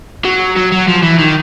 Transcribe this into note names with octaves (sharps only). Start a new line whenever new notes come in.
F#3
F#3
F#3
F3
E3
D#3